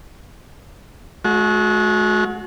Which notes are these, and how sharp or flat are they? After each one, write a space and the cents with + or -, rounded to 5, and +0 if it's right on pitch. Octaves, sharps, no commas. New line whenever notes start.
G#3 +45 F#4 -20